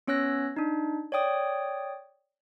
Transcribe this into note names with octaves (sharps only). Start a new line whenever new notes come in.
B3 C#4 C#5 E6 F#6 A#6
D4 D#4
C#5 D5 G5 D#6